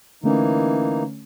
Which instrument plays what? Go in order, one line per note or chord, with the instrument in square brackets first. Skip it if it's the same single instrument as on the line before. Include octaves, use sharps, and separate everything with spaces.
[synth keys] D3 A3 C#4 [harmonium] E3 A#3 D#4